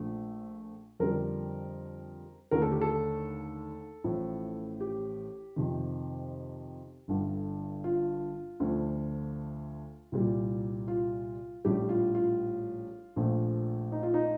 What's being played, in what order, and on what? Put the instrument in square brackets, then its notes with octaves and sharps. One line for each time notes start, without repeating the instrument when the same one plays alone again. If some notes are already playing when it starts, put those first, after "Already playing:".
Already playing: [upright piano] A#1 A#2 F3 A3
F2 D3 G3 A#4
D#2 D3 A3 A#4
A4
G4
A4
A1 A2 F3
G4
F2 C3 D#3
G1 G2 D3
F4
D2 D3 F3 A3
C2 A#2 G3
F4
A#1 A2 G3 G4
F4
F4
A#1 A#2 F3 A3
D#4
F4
D#4